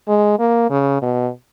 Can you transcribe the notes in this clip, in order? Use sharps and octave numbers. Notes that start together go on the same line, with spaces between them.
G#3
A#3
C#3
B2